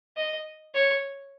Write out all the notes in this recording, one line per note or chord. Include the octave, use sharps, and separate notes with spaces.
D#5
C#5